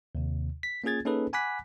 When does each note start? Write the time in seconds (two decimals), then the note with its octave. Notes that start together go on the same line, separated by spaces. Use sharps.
0.15 D#2 C3
0.63 B6
0.84 A#3 C#4 F4 G#4 G#6 A6
1.05 A#3 C#4 D#4 G#4 A4 B4
1.33 F#5 G#5 B5 D6 F#6 B6